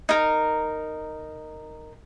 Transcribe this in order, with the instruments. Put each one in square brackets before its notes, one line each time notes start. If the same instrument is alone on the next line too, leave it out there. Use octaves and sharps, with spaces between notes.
[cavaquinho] D#4 A#4